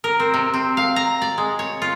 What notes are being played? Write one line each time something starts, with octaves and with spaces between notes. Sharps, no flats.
A#4
C4
C3
C4
F5
A#5
D5
G#3
C#5
F4